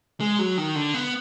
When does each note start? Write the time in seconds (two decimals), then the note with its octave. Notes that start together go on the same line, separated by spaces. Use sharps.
0.20 G#3
0.39 F#3
0.58 D#3
0.75 D3
0.94 B3